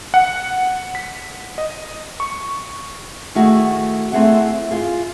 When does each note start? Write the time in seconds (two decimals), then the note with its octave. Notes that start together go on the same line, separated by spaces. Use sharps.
0.14 F#5
0.95 B6
1.58 D#5
2.20 C#6
3.35 D#3 A3 E4 F#4 G#4
4.12 A3 C4 E4 G#4 E5 F#5
4.71 F4 G#4